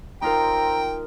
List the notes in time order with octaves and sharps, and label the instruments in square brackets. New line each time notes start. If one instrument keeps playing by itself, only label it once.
[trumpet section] C4 A#5 [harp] D#4 F4 A#4 [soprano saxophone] G5